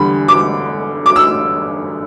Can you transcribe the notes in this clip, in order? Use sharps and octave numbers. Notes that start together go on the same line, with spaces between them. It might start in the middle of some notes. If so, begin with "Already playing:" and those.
Already playing: E2 D3 G3 B5
D6
D6
E6